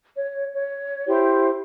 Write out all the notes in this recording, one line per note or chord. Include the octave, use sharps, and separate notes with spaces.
C#5
C#5
E4 G4 C5